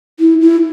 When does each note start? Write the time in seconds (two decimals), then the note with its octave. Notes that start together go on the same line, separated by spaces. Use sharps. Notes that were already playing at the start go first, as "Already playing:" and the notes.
0.19 E4
0.41 E4